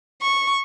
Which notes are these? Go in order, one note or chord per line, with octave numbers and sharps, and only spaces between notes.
C#6